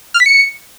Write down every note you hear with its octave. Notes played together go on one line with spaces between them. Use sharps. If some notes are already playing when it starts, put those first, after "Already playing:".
F6
B6
C#7